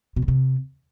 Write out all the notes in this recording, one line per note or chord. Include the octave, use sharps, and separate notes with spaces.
B2
E2
C3